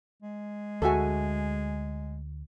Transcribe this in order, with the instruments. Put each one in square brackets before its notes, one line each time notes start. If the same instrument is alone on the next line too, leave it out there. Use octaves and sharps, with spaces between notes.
[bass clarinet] G#3
[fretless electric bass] D2 [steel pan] F#4 A4 [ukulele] G#4 E5 G#5